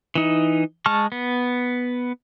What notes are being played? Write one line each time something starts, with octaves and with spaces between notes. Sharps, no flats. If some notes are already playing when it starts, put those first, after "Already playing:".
E3 D#4
G#3 A5 C#6 F6
B3